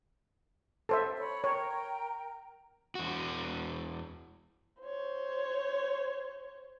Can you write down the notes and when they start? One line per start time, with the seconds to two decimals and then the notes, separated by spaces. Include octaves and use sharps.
0.89 A4 C5 E5
1.18 C#5 B5
1.44 A#4 C#5 G5 A#5
2.95 E2 F#4
4.82 C5 C#5